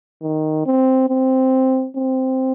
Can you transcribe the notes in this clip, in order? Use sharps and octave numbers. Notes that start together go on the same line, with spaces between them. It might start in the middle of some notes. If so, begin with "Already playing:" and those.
D#3
C4
C4
C4